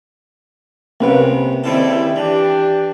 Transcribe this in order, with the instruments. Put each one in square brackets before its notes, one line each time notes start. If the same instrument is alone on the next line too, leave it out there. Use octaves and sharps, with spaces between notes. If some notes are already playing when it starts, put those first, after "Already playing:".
[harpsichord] C2 C3 [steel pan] A#3 C#4 B4
[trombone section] C#2 G3 E4 [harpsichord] D#3 C4 A4
[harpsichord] E3 [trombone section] D4 G4